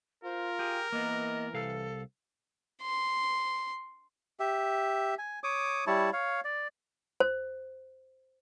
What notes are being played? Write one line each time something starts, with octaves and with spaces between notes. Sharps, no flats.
F4 A#4 C5
G4 G#4 G5
E3 A#3 B3 D#5
C2 A4 F5
C6
G4 E5
G#5
C#5 D6 D#6
G3 E4 C#5 A5
C#5 F5
D5
C5